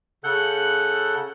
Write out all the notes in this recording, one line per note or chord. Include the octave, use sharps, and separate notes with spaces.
C#3 A4 F#5 F#6 G6